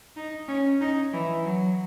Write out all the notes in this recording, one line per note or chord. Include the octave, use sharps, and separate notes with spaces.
D#4
C#4
D#4
E3
F#3